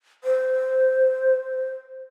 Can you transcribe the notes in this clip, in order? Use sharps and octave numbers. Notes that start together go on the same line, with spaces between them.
C5